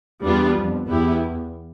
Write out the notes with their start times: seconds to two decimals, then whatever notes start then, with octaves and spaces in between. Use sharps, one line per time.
0.24 E2 G3 B3 D4 F4
0.57 F2
0.88 E2 B3 E4 G4